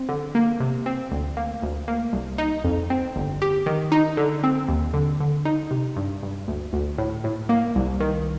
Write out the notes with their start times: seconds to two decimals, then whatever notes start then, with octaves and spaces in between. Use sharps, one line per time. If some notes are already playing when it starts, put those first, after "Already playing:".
Already playing: C4
0.09 D3
0.35 A#3
0.60 C3
0.86 C4
1.11 D2
1.37 A#3
1.62 D2
1.88 A#3
2.13 C2
2.38 D#4
2.64 F2
2.90 C4
3.16 G1
3.42 G4
3.66 D#3
3.92 D#4
4.17 D3
4.44 C4
4.69 D#2
4.94 D3
5.20 D3
5.45 D#4
5.71 C3
5.96 G2
6.23 G2
6.48 D2
6.73 D2
6.98 A2
7.24 A2
7.49 A#3
7.75 C2
8.00 D#3